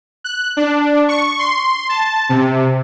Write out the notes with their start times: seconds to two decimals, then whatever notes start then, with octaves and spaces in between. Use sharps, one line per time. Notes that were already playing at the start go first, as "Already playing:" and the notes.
0.24 F#6
0.57 D4
1.08 C#6
1.39 C6
1.89 A5
2.29 C3